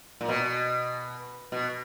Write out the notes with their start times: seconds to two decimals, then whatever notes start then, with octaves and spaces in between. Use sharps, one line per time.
0.21 A#2
0.28 B2
1.52 B2